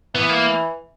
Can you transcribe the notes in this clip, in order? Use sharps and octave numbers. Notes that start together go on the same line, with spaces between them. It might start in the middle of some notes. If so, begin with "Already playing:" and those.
E3 B3
A#3